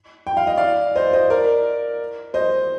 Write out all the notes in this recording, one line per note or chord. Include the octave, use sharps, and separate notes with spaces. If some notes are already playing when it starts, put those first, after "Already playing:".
G5
F5
D#5
D5 F5
C5 D#5
C5 D#5
A#4 D5
C5 D#5